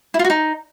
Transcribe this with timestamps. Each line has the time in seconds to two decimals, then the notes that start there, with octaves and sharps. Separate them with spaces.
0.14 E4
0.19 F4
0.24 F#4
0.30 D#4